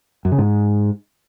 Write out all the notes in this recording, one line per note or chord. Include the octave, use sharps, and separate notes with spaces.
F#2
C#3
G#2